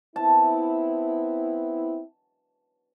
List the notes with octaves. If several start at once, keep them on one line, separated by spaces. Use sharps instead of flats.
B3 C4 E4 A5